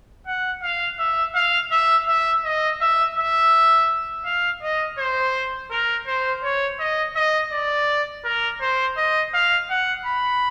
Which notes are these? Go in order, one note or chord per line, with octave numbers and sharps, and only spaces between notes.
F#5
F5
E5
F5
E5
E5
D#5
E5
E5
F5
D#5
C5
A#4
C5
C#5
D#5
D#5
D5
A#4
C5
D#5
F5
F#5
B5